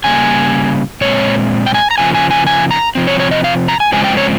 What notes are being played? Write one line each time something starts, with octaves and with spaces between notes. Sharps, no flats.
C#3 G3 A#3 G#5
A#2 G#3 C4 C#5
G5
G#5
A#5
C#3 F3 A#3 G#5
G#5
G#5
G#5
A#5
C3 F3 C4
C#5
C#5
D#5
F5
A#5
G#5
C#3 F3 G#3 C4 G#5
G5
C#5